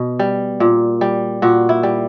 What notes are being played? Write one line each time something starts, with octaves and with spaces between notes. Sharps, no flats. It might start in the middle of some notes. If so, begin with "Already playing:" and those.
Already playing: B2
G3
A#2
G3
A#2 F#4
E4
G3